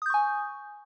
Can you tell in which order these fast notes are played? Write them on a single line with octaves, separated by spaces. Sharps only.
D#6 G6 C#6 G#5